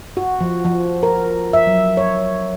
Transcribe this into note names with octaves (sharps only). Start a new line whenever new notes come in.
F#4
F3
F3
A#4
E5
F#3
C#5